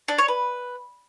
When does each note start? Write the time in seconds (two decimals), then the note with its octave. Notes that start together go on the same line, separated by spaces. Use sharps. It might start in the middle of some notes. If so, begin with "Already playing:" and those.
0.08 D4
0.18 C#5
0.28 B4